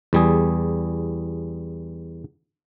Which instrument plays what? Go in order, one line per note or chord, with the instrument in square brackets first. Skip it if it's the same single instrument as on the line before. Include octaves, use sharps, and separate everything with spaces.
[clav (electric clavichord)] E2 G3 G#4